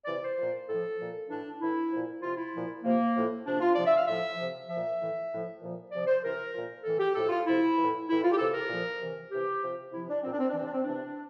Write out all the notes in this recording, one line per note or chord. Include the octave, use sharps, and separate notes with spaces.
C3 E3 D5
C5
A#2 F3
A2 A4
F3
A#2 F3
A2 E3 D4
A2 E3 E4
A#2 F3
C3 F3 F4
E4
A#2 F3
C3 F3 A#3
A2 F3
C3 F3 D4
F4
C3 F3 D5
E5
F5
A2 F3 E5
C3 F3
A#2 F3 E5
A2 E3
A2 F3
A#2 F3
C3 F3 D5
C5
C3 E3 A#4
A#2 F3
A2 E3 A4
G4
A2 F3 A4
F4
C3 F3 E4
A2 E3
A2 E3 E4
F4
G4
C3 E3 A4
A#4
A#2 F3
C3 E3
C3 E3 G4
C3 F3
C3 F3 E4
D4
A#2 F3 C4
D4
C4
D4
C3 E3 C4
D4
C4
C3 E3 D4